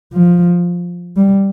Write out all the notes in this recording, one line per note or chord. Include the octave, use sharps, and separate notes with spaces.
F3
G3